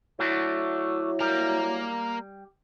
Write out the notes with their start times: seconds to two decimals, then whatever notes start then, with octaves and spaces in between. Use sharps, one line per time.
0.19 F#3 A3 D4 E4 F#4
1.20 G3 A#3 A#4